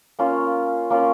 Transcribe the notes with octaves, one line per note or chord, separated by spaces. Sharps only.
A#3 C#4 F4
A#3 C#4 F4